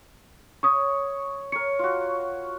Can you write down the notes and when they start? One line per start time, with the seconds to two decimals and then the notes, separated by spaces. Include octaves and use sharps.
0.63 C#5 C#6 D#6
1.52 A#4 C#5 C#7
1.79 F4 F#4